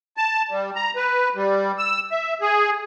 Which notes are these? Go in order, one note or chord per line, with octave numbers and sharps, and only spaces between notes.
A5
G3
A#5
B4
G3
E6
E5
G#4